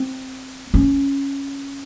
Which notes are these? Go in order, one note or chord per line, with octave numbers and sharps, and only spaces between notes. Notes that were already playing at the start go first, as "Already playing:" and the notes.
Already playing: C4
C#4